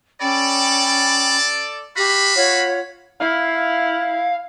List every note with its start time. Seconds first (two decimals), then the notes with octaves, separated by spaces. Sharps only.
0.20 C#4 A4 D5 G5 B5
1.96 F#4 G4 F5 B5
2.36 F4 C#5 F#5
3.20 E4 F5